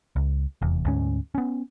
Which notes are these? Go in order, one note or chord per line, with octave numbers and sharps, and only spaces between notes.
C#2
F1 E2
D2 G#2 C#4
B3 C#4